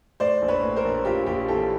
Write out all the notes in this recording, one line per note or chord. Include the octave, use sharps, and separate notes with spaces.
A2 C5 D5
A#1
B4 C#5
A2
A#4 C5
A#1
A#1 F4 G4
A#1 F4 G4
E3 G4 A4